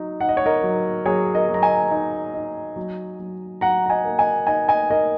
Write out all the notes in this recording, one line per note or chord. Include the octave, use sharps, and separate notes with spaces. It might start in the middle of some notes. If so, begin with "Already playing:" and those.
Already playing: F#3 D#4
D#4 F#5
D#5
C#5
A#4 D#5
F#3
F#3 G#4 C#5
A#4 D#5
F#3
A#5
D#5 G#5
D#4
D#4
F#3
F#3
F#3 F#5 A#5
A#5
D#5 G#5
A#3
D#5 G#5
D#4 D#5 G#5
D#5 G#5
D#4 A#4 D#5